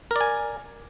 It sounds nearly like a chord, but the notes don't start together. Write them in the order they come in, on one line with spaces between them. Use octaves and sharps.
A#4 D5 G#5